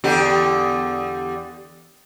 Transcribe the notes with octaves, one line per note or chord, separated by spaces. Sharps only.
E2 D3 G4